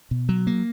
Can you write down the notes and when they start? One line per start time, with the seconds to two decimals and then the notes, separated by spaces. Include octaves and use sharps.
0.11 B2
0.29 F#3
0.47 A#3